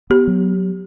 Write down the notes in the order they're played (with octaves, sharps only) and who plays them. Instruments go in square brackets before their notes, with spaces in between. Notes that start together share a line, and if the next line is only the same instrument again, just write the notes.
[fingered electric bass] B3 [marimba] G4
[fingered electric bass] F#3